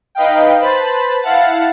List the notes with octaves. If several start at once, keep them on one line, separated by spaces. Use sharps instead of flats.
D#4 B4 D#5 F5 G5
B4 C5 A5 B5
E4 F5 F#5 A5